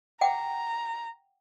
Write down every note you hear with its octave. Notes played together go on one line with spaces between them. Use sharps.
F#5 G5 A#5 D6